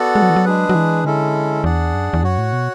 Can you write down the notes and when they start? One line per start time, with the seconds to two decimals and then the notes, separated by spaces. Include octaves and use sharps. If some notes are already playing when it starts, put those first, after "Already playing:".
Already playing: B3 F#4 A4 D5 F#5
0.15 G#3
0.22 F#3
0.30 E3
0.36 F#3
0.45 G#3 D4 G#4 B4
0.69 F#3
0.75 E3
1.04 D3 G#3 C#4 E4 A4
1.64 E2 D4 G#4 D5 F#5
1.94 F#2
2.13 E2
2.23 F#2 F#4 C#5 F#5
2.38 A2
2.53 B2